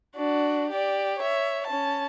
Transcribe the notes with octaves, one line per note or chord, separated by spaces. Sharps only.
D4 F#4
G4 D5
C#5 E5
C#4 A5